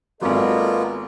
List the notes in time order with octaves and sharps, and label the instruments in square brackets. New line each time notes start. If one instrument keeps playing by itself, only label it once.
[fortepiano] G#1 F#3 [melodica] A#3 B3 F4 [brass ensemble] A4 D5 D#5